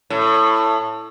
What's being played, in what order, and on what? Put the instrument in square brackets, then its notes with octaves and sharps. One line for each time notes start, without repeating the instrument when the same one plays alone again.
[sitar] A2